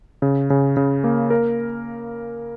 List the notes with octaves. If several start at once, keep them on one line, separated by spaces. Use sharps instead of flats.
C#3
C#3
C#3
A#3
A#4